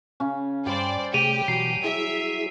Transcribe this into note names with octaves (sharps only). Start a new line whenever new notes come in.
C#3 C#4
G2 G3 C5 D5 G5
C3 A3 G4 G#4 D7 D#7 F7
B2 E3 F#3 C7
E4 G#4 E5